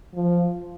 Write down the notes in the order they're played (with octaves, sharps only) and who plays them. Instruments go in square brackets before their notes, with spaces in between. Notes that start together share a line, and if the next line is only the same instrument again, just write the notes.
[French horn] F3